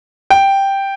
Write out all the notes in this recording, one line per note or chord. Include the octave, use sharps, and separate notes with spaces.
G5